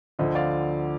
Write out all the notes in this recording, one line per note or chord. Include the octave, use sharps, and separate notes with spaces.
D2 D3 F3 C5 D#5
D5 F5